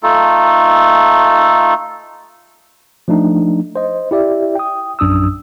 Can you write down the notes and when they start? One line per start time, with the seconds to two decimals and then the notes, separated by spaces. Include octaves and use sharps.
0.03 A3 D#4 F4 A4
3.08 F3 A3 D4 D#4
3.76 C5 D#5
4.11 E4 G4 D5 E5
4.55 G5 D#6
4.99 A#1 F#2 D4 D#6 E6